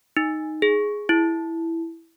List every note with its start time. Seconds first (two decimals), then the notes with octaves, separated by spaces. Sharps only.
0.17 D#4
0.62 G#4
1.09 E4